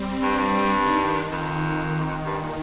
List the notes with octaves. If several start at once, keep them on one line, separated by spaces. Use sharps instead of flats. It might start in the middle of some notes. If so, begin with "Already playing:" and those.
Already playing: G3 C4
G2
G2
D#3
F2 D#3
G2
A#2